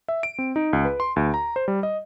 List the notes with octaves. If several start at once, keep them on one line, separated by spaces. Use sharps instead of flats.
E5
D7
C4
D#4
C#2
B4
C6
D2
A#5
C5
G3
D#5